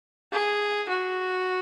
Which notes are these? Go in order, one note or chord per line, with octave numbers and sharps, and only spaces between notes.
G#4
F#4